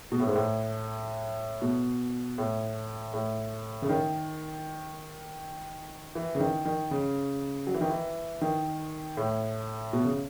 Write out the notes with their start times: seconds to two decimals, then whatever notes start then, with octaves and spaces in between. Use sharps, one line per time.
0.12 B2
0.20 A2
0.27 G#2
0.36 A2
1.62 B2
2.38 A2
3.14 A2
3.82 C#3
3.89 D#3
6.15 E3
6.35 C#3
6.40 D#3
6.65 D#3
6.91 C#3
7.67 F#3
7.74 E3
7.81 D#3
7.90 E3
8.41 D#3
9.17 A2
9.93 B2
10.05 C#3